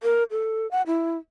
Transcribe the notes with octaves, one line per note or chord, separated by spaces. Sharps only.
A#4
A4
F#5
E4